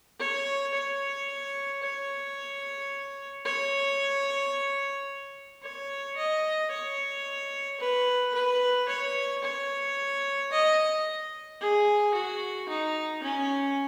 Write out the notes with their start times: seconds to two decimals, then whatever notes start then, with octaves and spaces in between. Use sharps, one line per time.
0.20 C#5
0.74 C#5
1.83 C#5
3.45 C#5
5.63 C#5
6.17 D#5
6.71 C#5
7.80 B4
8.35 B4
8.88 C#5
9.43 C#5
10.52 D#5
11.61 G#4
12.14 F#4
12.69 D#4
13.23 C#4